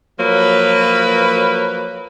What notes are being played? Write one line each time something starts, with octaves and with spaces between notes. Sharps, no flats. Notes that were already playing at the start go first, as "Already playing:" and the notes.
F3 F#3 A#3 B4